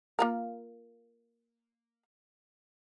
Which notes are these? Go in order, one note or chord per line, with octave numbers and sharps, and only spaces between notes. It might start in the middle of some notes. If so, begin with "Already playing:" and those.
A#3 F4 A#4